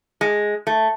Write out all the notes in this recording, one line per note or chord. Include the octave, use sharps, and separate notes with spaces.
G#3
A3